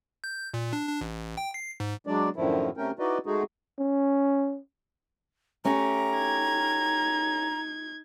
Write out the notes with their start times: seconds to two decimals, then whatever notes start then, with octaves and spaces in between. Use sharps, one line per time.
0.24 G6
0.54 A#2
0.73 D4
0.88 D4
1.01 A1
1.37 G5
1.54 C7
1.80 G#2
2.07 F#3 G#3 D4 D5
2.36 F#2 A2 D3 D#3 F3 E4
2.77 C3 A3 C#4 A#4 G5
2.99 D#4 E4 F#4 B4 D5 D#5
3.26 G#3 A3 D#4 F#4 G#4
3.79 C#4
5.65 A3 C#4 G4 A#5
6.15 D#4 G#6